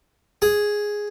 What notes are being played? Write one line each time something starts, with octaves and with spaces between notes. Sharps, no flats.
G#4